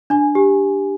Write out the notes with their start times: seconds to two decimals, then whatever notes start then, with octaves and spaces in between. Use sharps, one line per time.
0.10 D4 G#5
0.35 G4